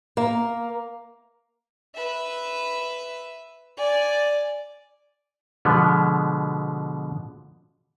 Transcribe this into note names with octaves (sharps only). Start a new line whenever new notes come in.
A#3
B4 E5
D5 G#5
B2 D3 F3 G#3 B3